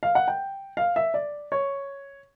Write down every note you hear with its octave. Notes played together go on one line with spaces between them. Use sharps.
F5
F#5
G5
F5
E5
D5
C#5